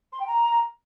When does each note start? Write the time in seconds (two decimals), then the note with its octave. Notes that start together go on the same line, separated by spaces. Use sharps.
0.12 C6
0.19 G5
0.27 A#5